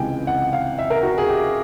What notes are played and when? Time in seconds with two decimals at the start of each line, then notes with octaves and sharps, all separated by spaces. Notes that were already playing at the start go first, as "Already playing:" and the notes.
Already playing: C#2 C3 E3 G#3 G5 G#5
0.27 F#5
0.53 F5
0.79 E5
0.90 A#4
1.03 F#4
1.18 G#4
1.29 G4